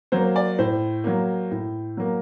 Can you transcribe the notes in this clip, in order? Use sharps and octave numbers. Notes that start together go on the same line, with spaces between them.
F#3 A#3 C5
D5
A2 C5
F#3 A#3
A2
F#3 A#3